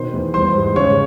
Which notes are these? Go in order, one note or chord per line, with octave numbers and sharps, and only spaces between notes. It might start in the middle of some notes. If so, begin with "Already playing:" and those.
Already playing: B2 D#3 C5 C6
E2
G3 C5 C6
G#2
C#3 C#5 C#6